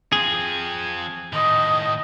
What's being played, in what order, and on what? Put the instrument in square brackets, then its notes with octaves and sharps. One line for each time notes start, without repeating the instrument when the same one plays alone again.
[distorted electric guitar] F3 C4 [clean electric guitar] G#4
[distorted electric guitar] A2 D#3 [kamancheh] D#5